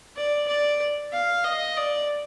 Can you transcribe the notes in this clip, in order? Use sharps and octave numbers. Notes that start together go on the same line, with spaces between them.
D5
D5
F5
D#5
D5